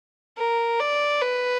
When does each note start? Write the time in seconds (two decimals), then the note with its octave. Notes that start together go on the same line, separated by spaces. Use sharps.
0.38 A#4
0.80 D5
1.22 B4